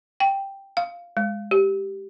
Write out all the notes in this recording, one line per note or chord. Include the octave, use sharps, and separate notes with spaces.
G5
F5
G#3
G4